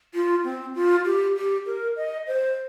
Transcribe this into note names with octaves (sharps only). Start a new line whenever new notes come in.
F4
C4
F4
G4
G4
A#4
D#5
C5